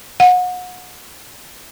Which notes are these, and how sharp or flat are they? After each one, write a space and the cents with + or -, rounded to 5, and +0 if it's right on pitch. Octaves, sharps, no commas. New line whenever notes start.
F#5 -30